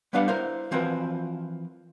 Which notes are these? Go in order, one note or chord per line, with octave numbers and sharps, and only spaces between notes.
G3 B3 D4 B4 F5 F#5
E4 A#4 C5
E3 F3 C4 F#4 A#4 B4